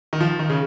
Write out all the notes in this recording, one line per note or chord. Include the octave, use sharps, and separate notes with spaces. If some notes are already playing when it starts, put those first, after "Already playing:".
D#3
F3
D#3
C#3